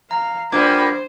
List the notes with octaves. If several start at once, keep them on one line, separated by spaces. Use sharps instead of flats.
F5 A#5
A#2 G3 B3 D4 C5 D6 G#6